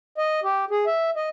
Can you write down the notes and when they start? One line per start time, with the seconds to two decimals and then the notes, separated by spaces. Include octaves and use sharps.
0.18 D#5
0.44 G4
0.71 G#4
0.86 E5
1.16 D#5